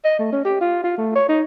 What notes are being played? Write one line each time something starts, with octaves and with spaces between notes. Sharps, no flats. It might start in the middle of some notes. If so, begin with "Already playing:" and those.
D#5
A3
C#4
G4
F4
F4
A3
C#5
D#4